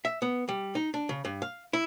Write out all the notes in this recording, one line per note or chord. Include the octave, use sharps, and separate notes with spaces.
E5
B3
G3
D#4
D4
C#3
G2
F5
E4